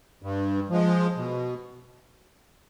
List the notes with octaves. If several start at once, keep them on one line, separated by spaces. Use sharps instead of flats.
G2
F3 G#3
B2